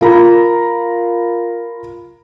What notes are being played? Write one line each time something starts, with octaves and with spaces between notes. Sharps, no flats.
F4 A#4 A#5 B5